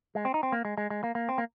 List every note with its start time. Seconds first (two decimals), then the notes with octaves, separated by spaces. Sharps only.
0.15 G#3
0.25 C4
0.34 D#4
0.43 C4
0.52 A#3
0.65 G#3
0.78 G#3
0.90 G#3
1.04 A#3
1.15 A#3
1.29 C4
1.38 A#3